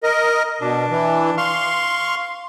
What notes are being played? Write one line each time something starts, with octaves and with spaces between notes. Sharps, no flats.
A#4 D#5
B2 D4
E3
F5 C6 C#6